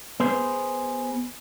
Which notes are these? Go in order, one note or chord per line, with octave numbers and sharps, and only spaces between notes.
B3 G#4 C5